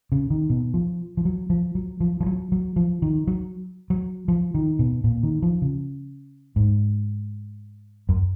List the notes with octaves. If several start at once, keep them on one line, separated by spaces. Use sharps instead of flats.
C#3
D#3
B2
F3
F3
F#3
F3
F#3
F3
F3
F#3
F#3
F3
D#3
F#3
F#3
F3
D#3
B2
A#2
D#3
F3
C#3
G#2
F#2